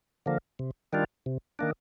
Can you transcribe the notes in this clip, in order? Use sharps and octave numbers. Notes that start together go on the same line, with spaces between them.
D3 F3 A#3
C3
D#3 G3 D4 F4
C3
D#3 A#3 D4